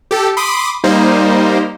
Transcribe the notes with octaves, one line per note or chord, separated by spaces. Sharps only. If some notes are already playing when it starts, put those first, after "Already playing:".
G4 A4
B5 C6 D6 D#6
G3 A#3 D#4 C5